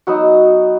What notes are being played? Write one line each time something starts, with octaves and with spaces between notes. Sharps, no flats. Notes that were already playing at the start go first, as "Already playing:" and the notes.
F#3 B3 D#4 F#4